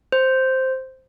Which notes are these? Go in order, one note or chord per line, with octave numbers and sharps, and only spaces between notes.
C5